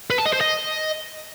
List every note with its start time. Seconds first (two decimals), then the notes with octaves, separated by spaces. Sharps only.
0.10 B4
0.18 A5
0.26 D#5
0.33 C5
0.41 D#5